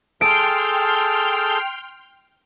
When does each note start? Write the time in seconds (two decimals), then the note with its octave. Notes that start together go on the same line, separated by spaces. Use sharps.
0.21 G#4 A4 G5 A5 C6 F6 D7